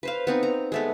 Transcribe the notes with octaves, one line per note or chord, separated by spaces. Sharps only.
B4 C5 F5
B3 C4 D#4
A#5
G#3 A3 B3